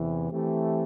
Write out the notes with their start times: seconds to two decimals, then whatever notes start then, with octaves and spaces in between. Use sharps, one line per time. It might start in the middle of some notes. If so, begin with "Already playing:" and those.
Already playing: E2 C3 E3
0.31 E3 A3 C4 G4